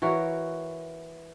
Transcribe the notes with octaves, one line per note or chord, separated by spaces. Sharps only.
E3 F#4 A#4 C#5